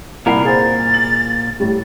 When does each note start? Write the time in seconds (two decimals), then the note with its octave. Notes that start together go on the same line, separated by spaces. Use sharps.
0.26 C2 A#2 A#4 F#5 B5 C7
0.45 G#4 C5 A6
0.94 F#7
1.60 A2 G3